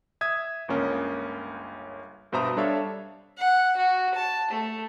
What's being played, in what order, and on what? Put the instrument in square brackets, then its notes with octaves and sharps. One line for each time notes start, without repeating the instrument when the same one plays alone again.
[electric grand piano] E5 D#6 G#6
G1 C#2 A#3 C#4 A#4
G2 B2 C5 E5 A#5 D#6
G3 D4 A4 C#5 E5 F5
[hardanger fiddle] F#5
F#4
A5
A3